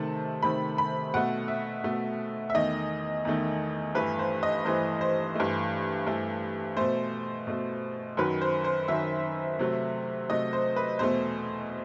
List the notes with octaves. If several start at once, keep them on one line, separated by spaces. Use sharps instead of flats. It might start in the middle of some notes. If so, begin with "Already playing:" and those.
Already playing: C3 D#3 A3 A5
C3 D#3 A3 B5
B5
B2 A3 F#5
E5
B2 A3
E5
E2 D#3 A3 D#5
E2 D#3 A3
G2 E3 A3 B4
C5
D#5
G2 E3 A3 C5
C5
G2 E3 A3
G2 E3 A3
B2 A3 C5
B2 A3
F#2 D#3 F#3 B4
C5
C5
F#2 D#3 F#3 E5
C3 F#3 A3
C3 F#3 A3 D#5
C5
B4
E2 B2 A3 C5